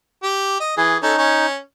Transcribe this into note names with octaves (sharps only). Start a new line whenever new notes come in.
G4
D#5
E3 G#4
C#4 D#4 A4
C#4